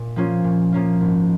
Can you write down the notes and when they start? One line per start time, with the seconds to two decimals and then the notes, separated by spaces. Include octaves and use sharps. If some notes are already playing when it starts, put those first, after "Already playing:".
Already playing: A#2
0.16 F3 A#3 C#4 F4
0.44 A#2
0.73 F3 A#3 C#4 F4
1.01 G#1